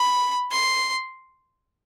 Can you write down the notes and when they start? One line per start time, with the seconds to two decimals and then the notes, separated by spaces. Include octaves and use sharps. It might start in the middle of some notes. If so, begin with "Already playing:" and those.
Already playing: B5
0.51 C6